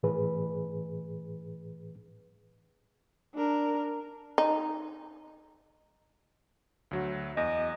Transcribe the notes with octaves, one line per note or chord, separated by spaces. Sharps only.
A2 E3 G#4 B4
D4 A#4
D#4
D2 F#3 F#4
E2 D#5